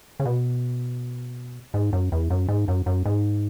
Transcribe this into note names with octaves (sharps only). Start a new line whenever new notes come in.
C#3
B2
G#2
F#2
E2
F#2
G#2
F#2
F#2
G#2